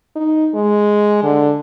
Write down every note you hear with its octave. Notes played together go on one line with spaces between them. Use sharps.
D#4
G#3
D3